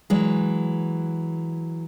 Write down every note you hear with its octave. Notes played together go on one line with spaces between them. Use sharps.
E3 F#3 G#3